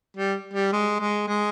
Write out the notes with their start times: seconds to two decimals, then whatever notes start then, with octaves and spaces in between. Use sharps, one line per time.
0.17 G3
0.54 G3
0.72 G#3
1.00 G#3
1.28 G#3